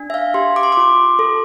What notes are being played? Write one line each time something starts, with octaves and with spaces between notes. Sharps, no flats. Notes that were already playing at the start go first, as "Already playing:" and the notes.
Already playing: D4
E5
F5
G4 C6
D6
C6
F4 D6
A4